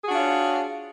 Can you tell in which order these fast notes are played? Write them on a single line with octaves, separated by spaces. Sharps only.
G#4 F#4 D4 F4 C#5